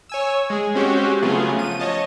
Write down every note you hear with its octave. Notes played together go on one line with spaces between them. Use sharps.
C#5 G#5 E6
G#3 G#4
G#3 C4 C#4 F#4 G4
C#3 F#3 A3 B3 F4 G#4
F3 D#7
C#5 D#5 A5